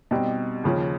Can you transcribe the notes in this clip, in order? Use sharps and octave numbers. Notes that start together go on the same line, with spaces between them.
B2 G3 C4 D#4
D#2 C#3 F3